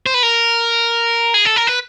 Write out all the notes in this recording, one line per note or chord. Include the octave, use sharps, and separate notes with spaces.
C5
B4
A#4
G#4
A4
A#4
B4